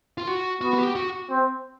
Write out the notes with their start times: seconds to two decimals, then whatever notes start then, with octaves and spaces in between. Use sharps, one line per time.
0.18 F4
0.27 F#4
0.61 B3 F#4
0.74 F#4
0.78 G4
0.95 F#4
1.30 C4